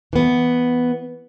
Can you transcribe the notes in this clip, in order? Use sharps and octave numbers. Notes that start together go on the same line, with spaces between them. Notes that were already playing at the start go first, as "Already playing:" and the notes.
E3 B3